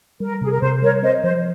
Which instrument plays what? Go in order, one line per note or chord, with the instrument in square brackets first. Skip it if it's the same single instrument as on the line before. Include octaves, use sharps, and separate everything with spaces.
[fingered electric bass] G3 [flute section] A#4
[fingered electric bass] C3 [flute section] G#4
[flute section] A#4
[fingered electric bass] C3 [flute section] C5
[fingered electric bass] G3 [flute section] A#4 C#5
[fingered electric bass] C4 [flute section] C5 D#5
[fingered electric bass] F3 [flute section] C5